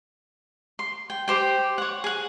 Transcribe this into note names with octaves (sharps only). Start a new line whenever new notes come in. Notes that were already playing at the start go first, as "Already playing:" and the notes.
C6
G5
G4 C5 G5
C#5 F#5
G#4 F#5